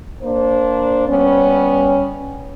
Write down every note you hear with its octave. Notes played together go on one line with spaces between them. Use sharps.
A#3 D4 C5
G3 B3 C#4